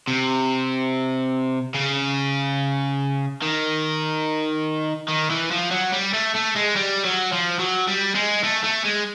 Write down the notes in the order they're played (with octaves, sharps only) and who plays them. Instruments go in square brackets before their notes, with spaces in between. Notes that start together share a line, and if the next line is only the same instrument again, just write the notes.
[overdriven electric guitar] C3
C#3
D#3
D#3
E3
F3
F#3
G3
A3
A3
G#3
G3
F#3
F3
F#3
G3
G#3
A3
A3
G#3